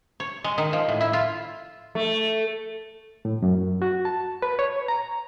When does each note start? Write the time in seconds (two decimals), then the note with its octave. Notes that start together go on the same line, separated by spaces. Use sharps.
0.20 C#5
0.44 G#3
0.58 D#3
0.73 F3
0.88 A2
1.01 E4
1.13 F4
1.95 A3
3.25 A2
3.42 F#2
3.82 F#4
4.05 A5
4.42 B4
4.59 C#5
4.88 A#5